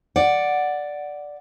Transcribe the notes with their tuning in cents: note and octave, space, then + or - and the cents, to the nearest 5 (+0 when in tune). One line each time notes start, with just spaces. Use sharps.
D5 +0 F#5 +0